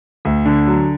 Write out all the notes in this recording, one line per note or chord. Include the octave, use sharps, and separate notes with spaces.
D2
D3
F#3